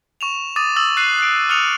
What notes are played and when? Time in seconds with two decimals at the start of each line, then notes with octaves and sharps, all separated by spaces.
0.21 C#6 E7 F7
0.56 D6 D#6 A6 D#7
0.76 D#6 E6 A6 F#7
0.97 F#6 C7 D#7
1.18 F#6 C7 D7
1.49 D#6 F6 F#6 C#7 D#7 F7